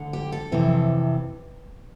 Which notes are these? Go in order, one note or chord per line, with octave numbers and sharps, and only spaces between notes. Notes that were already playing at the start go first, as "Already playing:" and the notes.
Already playing: D2 D3
G4
A4
F2 C3 E3